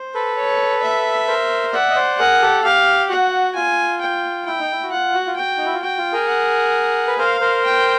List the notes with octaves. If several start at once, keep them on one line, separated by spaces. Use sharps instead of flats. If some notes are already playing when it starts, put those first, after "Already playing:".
Already playing: C5
A4 B4
C#5
E5
A#4 C5
D5 E5 F#5
D#5
C5 D5
G#4 A#4 F#5
G4 A4
G4 F5
F#4 F#5
F4 G#5
G5
E4 G5
D#4
E4
F#4
F4 F#5
F#4
F4
F#4 G5
D#4
E4
F4
F#4 G5
F4
G#4 A#4
F#5
B4
A#4 C5 F5
A#4 C5
G5